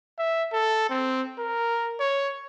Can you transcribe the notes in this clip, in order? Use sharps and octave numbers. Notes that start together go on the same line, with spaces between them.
E5
A4
C4
A#4
C#5